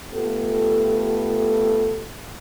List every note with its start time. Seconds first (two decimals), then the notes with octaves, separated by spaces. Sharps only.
0.13 A3 B3 F4 G4 A4